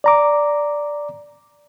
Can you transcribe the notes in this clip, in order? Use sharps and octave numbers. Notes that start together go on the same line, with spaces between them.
D5 A#5 D6